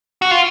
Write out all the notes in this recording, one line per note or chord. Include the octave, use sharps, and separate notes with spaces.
F#4
F4